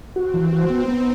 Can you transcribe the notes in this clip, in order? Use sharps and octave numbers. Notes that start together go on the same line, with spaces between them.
C4 F#4
E3
F#4
B3 D#4
B3